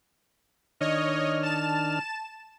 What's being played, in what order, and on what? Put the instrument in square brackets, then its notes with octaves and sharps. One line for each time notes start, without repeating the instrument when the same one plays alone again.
[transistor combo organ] D#3 D4 F6 [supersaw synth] C#5 D#5
[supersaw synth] A5 E7